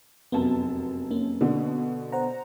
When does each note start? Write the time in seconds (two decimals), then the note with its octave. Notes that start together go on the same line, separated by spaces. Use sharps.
0.32 F1 F#2 B3 A5
1.11 A#3 C#4
1.41 B2 D3
2.12 C5 F#5 A#5